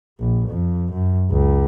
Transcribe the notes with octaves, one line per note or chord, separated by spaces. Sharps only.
A#1
F2
F#2
C#2